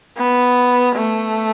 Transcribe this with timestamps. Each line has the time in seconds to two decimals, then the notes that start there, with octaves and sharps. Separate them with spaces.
0.17 B3
0.96 A3